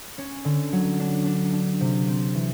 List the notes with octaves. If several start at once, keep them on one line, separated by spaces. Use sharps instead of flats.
C#4
D3
F#3
D4
D4
D4
C3
C4
E3